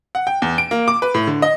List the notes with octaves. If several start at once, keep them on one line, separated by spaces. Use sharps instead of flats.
F#5
G5
E2
D7
A#3
D6
B4
A2
D3
D#5